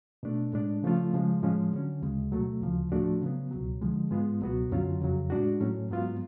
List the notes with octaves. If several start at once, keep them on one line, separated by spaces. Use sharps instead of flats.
B2 A3 D4
A2 G#3 D4
C#3 F3 A3 C#4 F4
C#3 F3 G#3
A2 F3 G#3 C#4
D3 F#3 C#4
D2 C#3 G#3
B2 F#3 A3
D2 C#3 F3
A2 F3 A3 D4 F#4
C#3 F#3 B3
C#2 B2 F#3
D3 F3 G#3
G#2 G#3 B3 F4
C#2 B2 F#3 B3 F#4
F#2 D3 F#3 C#4 F4
F2 C#3 F#3
A2 G#3 D4 F#4
A2 F#3 C#4
G#2 F#3 B3 F4